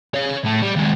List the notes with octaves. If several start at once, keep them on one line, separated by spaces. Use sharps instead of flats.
C#5 F5
A2 A3
G3
D#2 G#3